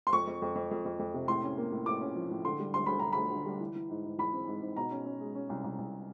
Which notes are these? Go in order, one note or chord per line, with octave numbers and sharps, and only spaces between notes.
C6
F2 C#6
F2
F2
F2
F2
F2
F2
C3
A2 C6
C#4
A#3
A2
A2 D6
C#4
F3
A2
D3 C6
G3
D2 C6
D2 B5
D3 A#5
D2 B5
D3
G3
E3
E3
G#2
G#2
E3 B5
C4
G#2
G#2
B2 A#5
C#4
C#4
G#3
C#4
C2
C2
C2